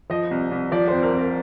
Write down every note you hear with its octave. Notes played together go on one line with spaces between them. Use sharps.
F3 D#5
C2
C2
F3 D5
F2 C5
A#4
F2
A#4